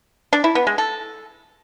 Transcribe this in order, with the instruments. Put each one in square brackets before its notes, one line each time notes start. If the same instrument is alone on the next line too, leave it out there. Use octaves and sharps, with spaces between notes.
[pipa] D4
E4
B3
G#3
A4